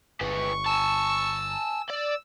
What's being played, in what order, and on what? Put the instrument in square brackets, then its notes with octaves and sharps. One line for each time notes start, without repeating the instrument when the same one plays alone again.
[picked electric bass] G1 [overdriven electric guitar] G#3 B4 [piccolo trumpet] C#6
[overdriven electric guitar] G#5 A5 [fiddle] E6
[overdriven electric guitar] D5 [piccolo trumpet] E6